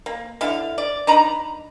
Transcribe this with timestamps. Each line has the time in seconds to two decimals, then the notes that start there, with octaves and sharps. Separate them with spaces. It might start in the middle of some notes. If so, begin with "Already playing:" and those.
0.06 A#3
0.41 D3 E4 F5
0.78 D5
1.07 D4 D#4 A#5 B5